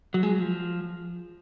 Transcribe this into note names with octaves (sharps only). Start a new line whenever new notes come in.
F#3
G#3
F#3
F3